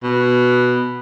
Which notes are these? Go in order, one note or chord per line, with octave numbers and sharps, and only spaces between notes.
B2